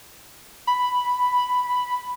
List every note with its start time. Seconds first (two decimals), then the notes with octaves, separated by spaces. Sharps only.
0.67 B5